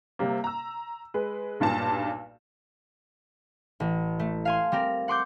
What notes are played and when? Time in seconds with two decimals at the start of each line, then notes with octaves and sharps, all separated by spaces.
0.19 C3 G3 A#3
0.44 A#5 E6
1.14 G#3 B4
1.60 B1 G2 A#2 A5
3.80 A1
4.19 A3
4.45 F5 G#5 C6
4.72 G3 C4 A#4
5.08 F#5 C6 D6 G6